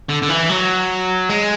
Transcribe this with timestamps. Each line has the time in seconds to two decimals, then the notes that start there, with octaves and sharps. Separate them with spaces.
0.09 D3
0.22 D3
0.29 E3
0.49 F#3
1.29 G#3